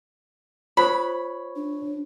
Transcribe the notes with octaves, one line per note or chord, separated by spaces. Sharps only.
F4 C5 C#5 B5 D#6
D4